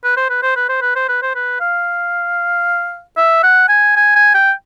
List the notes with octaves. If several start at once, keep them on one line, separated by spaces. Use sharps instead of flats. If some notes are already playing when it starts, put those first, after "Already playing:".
B4
C5
B4
C5
B4
C5
B4
C5
B4
C5
B4
F5
E5
F#5
G#5
G#5
G#5
G5